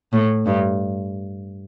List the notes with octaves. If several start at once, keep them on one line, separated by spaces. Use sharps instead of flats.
A2
G2